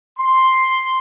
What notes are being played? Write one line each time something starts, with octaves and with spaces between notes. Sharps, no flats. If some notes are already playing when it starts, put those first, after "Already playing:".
C6